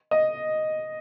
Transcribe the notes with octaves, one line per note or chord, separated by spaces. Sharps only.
D#5